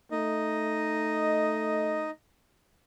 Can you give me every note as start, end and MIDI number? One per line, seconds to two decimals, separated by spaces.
0.11 2.10 57
0.11 2.10 63
0.11 2.10 75